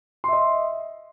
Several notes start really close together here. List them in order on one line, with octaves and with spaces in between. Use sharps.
C6 E5 D#5